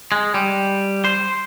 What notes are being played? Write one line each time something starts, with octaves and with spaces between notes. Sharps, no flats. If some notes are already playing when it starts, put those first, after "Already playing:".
G#3
G3
C5